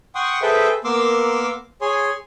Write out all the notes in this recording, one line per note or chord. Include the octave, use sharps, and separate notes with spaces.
F#5 G5 C6 C#6 D#6
G#4 A4 B4 C5 E5 G5
A#3 B3 A#4 C6 D6 E6
G#4 C#5 G#5 C6